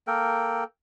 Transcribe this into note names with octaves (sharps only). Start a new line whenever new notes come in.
A#3 A4 A#4 G5